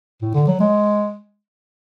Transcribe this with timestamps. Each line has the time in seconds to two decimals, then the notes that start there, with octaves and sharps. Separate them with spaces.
0.22 A2
0.34 D3
0.47 F#3
0.60 G#3